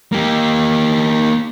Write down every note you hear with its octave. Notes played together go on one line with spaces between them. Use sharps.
A#3 G4